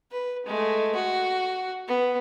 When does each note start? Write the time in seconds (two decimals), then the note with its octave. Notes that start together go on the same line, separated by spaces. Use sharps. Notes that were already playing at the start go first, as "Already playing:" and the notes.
0.12 B4
0.46 G#3 A3
0.95 F#4
1.87 B3